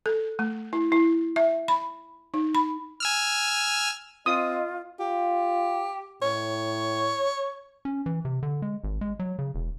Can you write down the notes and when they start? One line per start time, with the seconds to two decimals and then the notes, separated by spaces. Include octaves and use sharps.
0.06 A4
0.39 A3
0.73 E4
0.92 E4
1.36 E5
1.68 B5
2.34 D#4
2.55 B5
3.00 G#5 E6 F6
4.26 C4 F4 D#5 D#6
5.00 F4 G4
6.22 A2 C#5
7.85 C#4
8.06 E3
8.25 C3
8.43 D3
8.62 G#3
8.84 G#1
9.01 G#3
9.19 F#3
9.39 C#3
9.55 E1